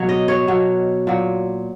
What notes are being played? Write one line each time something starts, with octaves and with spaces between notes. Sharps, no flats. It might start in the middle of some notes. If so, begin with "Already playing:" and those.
Already playing: B2 F#3 C#5
D#5
C#5
B2 F#3
A#2 F#3